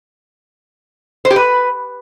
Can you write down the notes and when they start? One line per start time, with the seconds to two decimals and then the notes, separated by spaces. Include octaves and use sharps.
1.25 C5
1.30 G4
1.36 B4